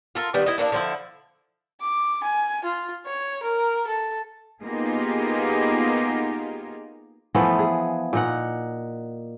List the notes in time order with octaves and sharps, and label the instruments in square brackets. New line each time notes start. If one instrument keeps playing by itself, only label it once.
[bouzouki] F4 A4 A#4
D#3 G3 B3
E4 D#5
A3 A#3 D4 E4
D3 F3 E4
[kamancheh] D6
G#5
F4
C#5
A#4
A4
[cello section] A#3 B3 D#4 F4 G4 G#4
[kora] E3 F3 A3 B3
G#4
A#2 D#4 F#5